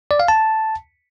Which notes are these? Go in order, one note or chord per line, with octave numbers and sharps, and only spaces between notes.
D5
F5
A5